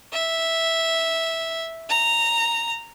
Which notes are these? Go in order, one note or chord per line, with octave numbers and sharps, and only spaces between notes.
E5
A#5